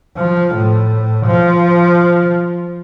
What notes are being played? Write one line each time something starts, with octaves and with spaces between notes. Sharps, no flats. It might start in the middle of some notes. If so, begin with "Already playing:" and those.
F3
A2
F3